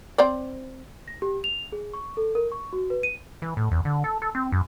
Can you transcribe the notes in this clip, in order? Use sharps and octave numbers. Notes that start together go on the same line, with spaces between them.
C4 C5 D5
A#6
G4
F7
G#4
C#6
A4
A#4
C#6
F#4
B4
D#7
E3
A2
E2
D3
A4
A4
C4
F#2